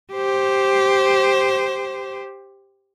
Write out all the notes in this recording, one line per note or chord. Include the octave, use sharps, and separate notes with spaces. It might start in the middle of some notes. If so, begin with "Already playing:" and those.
G4 C5